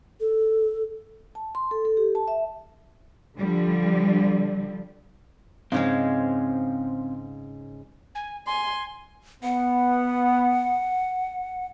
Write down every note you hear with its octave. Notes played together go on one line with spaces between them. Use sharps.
A4
A5
C6
A4
A4
G4
A5
E5
D3 F3 G3
G#2 C#3 G#3 C4 F5
G#5
G#5 C6
B3 F#5